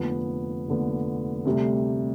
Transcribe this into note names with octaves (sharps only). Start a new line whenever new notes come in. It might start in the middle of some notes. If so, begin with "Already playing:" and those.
Already playing: F1 D#2 D3 F3 B3
F1 D#2 D3 F3 B3
D2 C3 G3